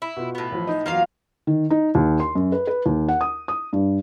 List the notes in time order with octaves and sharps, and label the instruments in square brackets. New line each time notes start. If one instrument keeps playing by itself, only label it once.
[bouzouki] E4
[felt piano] B2 F4
[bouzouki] A2 B3
[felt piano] A1 F3
D#4 D#5
[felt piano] E2 F#3 [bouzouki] A#3 F4 F5
[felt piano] D#3
D#4
D#2
C6
F#2
B4
B4
D#2
F#5
D#6
D#6
G2